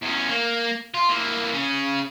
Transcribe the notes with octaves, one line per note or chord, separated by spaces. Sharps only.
E2 C#4
A#3
F4
E3 A#3
C#3 C#4